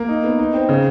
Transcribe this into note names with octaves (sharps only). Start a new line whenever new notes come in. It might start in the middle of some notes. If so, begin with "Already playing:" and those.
Already playing: A#3
D#4
B3
D#4
C4
C#3